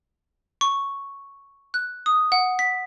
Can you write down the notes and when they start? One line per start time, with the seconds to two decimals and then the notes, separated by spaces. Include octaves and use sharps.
0.61 C#6
1.74 F#6
2.06 D#6
2.32 F#5
2.59 B6